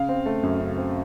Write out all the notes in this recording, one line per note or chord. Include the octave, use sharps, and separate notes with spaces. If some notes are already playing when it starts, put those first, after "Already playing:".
Already playing: C#3 F5
C4
A3
F#2
C#3
C4